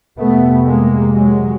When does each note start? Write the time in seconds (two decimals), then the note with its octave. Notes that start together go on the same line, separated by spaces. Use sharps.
0.18 F2 C3 A3 B3
0.66 G#3 A#3
1.13 F#3 G#3